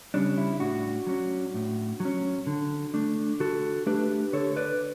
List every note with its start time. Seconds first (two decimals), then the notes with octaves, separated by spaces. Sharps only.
0.14 C#3 G3 C#4 D4
0.38 E4
0.60 A2 D4 F#4
1.07 F#3 C#4
1.54 A2
2.00 F#3
2.05 C#4
2.47 D3
2.94 A3 D4
3.40 D3 F#4 A4
3.86 A3 D4 G4 B4
4.33 D3 A4 C#5
4.56 B4 D5